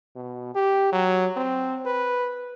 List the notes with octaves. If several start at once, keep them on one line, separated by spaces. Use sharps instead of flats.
B2
G4
F#3
C4
B4